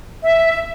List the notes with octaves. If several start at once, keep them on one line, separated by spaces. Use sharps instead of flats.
E5